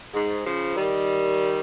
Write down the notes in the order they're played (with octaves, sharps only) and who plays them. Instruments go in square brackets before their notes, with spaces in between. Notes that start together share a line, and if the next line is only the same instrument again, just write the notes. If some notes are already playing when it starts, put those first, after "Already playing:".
[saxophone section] G#2
C#3 F3
D#3 G3